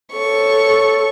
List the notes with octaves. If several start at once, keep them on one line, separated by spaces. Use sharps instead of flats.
A4 C#5 C#6